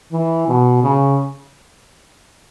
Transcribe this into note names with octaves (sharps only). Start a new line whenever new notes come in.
E3
B2
C#3